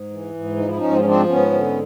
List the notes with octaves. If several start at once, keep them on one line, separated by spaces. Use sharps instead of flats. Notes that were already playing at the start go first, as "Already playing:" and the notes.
Already playing: G#2
E3
G#2
F3 D#4
E4
G#2 C#4 D#4
C4
C#4
F3 C4 D4
G#2 B3 C#4
D3